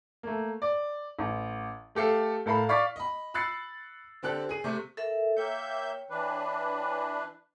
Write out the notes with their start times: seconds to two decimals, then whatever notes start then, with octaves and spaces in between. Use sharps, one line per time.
0.23 A3 A#3
0.62 D5
1.19 A1
1.95 A3 G4 A4 F5
2.46 A2 A4 A#4 F5 B5
2.69 D5 F5 C#6 D6 A6 B6
2.96 D#5 B5
3.34 B5 E6 F#6 A6 C7 C#7
4.22 D3 C4 G4 A4 F#6
4.49 G#4 D#7
4.64 C3 A3
4.97 A4 A#4 E5
5.37 A#3 C#5 E5 G5 G6
6.10 E3 D4 B4